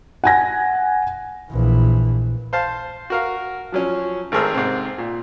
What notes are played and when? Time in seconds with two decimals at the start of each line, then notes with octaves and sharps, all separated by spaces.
0.24 F#5 G#5 A#6
1.52 A#1 E3
2.53 C5 F5 A5
3.10 F#4 A#4 F5
3.72 F3 F#3 C#4
4.32 G#1 A3 G#4 A#4 C5 E6
4.54 G#2 C3 C4
4.98 A#2